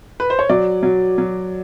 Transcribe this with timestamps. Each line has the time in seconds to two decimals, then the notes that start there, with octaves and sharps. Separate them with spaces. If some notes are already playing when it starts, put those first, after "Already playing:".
0.20 B4
0.30 C5
0.39 C#5
0.49 F#3 D5
0.83 F#3
1.18 F#3